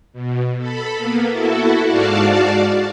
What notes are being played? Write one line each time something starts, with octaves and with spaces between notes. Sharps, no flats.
B2
A4 B5
A#3 B3
E4 F#4 A4
G#2 F#4 D5 F5 A5